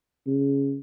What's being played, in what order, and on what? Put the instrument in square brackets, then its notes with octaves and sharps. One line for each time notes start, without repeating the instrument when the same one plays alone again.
[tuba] C#3